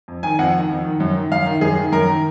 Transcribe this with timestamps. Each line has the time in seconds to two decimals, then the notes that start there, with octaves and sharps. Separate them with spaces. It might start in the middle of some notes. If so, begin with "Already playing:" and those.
0.08 F2
0.23 D#3 G#5
0.39 F2 F#5
0.55 D#3
0.70 F2
0.85 D#3
1.00 F#2
1.15 D#3
1.31 F#2 F5
1.46 D#3
1.61 F#2 G#4
1.77 D#3
1.92 F#2 A#4
2.08 D#3